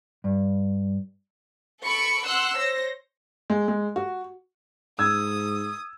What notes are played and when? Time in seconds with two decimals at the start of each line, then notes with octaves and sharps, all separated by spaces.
0.24 G2
1.83 A4 B5 C#6 D7
2.25 F#5 C6 E6 F#6
2.57 C5 C#5 A#6
3.50 G#3
3.68 G#3
3.96 F#4
4.99 G#2 D#6 E6 G#6